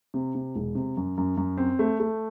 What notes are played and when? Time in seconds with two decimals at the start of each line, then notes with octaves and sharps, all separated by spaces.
0.14 C3
0.35 C3
0.55 E1
0.75 C3
0.97 F#2
1.17 F#2
1.37 F#2
1.57 C4
1.79 A3
2.00 A3